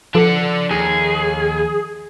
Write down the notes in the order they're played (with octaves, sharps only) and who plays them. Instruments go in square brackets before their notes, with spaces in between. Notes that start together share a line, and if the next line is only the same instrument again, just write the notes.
[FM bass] F3 [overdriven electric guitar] D4 F#5 [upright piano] A4
[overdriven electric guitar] D#2 [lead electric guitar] G#4